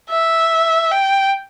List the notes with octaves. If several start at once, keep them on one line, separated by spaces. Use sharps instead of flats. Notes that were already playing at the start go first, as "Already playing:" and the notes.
E5
G5